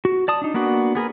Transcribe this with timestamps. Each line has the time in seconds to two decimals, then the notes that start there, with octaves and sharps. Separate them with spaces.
0.05 F#4
0.28 D5 A5 D#6
0.42 D4 D#4
0.54 A#3 B3 D4 F#4
0.95 B3 G#4 A#4 B4